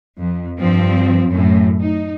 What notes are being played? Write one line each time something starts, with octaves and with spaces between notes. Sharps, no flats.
F2
G2 F3 C4
F#2 A2
D#4